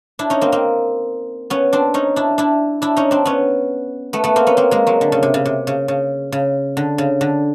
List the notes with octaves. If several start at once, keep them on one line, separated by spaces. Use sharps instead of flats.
D4 E4
C#4 D#4
A#3 C4
A#3 C4
B3 C#4
C4 D4
C#4 D#4
D4 E4
D4 E4
D4 E4
C#4 D#4
C4 D4
B3 C#4
A3 B3
A3 B3
A#3 C4
B3 C#4
A#3 C4
G#3 A#3
F#3 G#3
D3
C#3
C3
C#3
C3
C#3
C#3
C#3
D3
C#3
D3